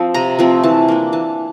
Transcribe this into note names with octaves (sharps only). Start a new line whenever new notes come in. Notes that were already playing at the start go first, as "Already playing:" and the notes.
Already playing: F3 C4
C3 A#5
F3 A3 C4
E3 A5
A#3 D4
E3 A5